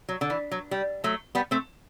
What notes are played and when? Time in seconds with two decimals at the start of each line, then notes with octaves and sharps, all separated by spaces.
0.09 F#3
0.21 D3
0.30 E3
0.51 F#3
0.71 G3
1.04 F#3 A3
1.35 G3 B3
1.51 A3 C4